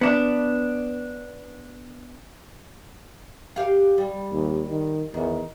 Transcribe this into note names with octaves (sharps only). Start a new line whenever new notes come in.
B3 D4
G4 F5
G3
D#2
D#3
E2 D#3